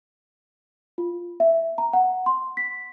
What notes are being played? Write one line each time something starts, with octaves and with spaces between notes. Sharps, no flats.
F4
E5
A#5
F#5
C6
B6